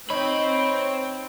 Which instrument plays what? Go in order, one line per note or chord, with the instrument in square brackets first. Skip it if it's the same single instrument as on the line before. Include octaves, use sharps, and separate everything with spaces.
[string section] C4 C5 G5 [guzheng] D#4 D#5 [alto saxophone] C#5 [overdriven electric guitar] B5